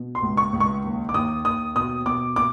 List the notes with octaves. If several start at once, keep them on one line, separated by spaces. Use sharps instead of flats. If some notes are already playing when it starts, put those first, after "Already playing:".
Already playing: B2
C6
C#2
C#6
C#2
C#6
D#2
D6
D#2 D#6
D#2 D#6
B2 D#6
B2 D6
B2 D6